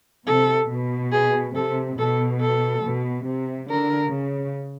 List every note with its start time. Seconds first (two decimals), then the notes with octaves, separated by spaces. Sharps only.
0.27 C3 A4
0.70 B2
1.12 G#4
1.55 C3 A4
1.98 B2 A4
2.41 A4
2.84 B2
3.27 C3
3.69 D3 A#4
4.12 C#3